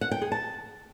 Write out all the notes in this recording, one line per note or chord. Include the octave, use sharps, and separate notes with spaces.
F#5
G5
G#4
A5